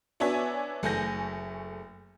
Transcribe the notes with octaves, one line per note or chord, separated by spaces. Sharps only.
B3 D4 F#4 C#5 E5 G#5
F#1 A3 G#5 G6 A#6